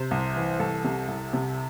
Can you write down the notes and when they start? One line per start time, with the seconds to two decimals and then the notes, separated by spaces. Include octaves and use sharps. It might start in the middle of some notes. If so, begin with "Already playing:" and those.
Already playing: C3 C5
0.11 C2
0.36 E3
0.59 C2 A4
0.84 C3
1.08 C2
1.33 C3